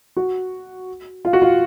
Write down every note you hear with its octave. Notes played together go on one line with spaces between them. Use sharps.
F#4
F4
F#4
F4